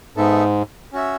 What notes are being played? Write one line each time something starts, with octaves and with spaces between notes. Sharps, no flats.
G#2 B3 D#4 A4 E5
C#4 F#4 C#5 E5